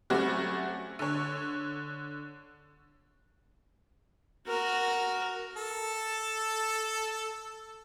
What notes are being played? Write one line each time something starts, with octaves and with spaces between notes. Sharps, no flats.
F#3 G3 A3 C4 C#4 F#4
D3 C#5
F#4 A#4
A4 A5